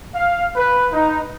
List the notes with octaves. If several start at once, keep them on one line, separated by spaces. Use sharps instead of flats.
F5
B4
D#4